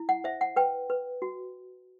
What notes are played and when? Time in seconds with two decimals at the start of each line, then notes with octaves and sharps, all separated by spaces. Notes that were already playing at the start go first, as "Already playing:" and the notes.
Already playing: E4
0.09 F#5
0.24 C5 E5
0.41 F#5
0.56 B4 G5
0.90 B4
1.22 F#4